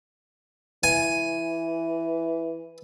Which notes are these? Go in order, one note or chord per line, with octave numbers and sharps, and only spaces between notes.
E3 G#5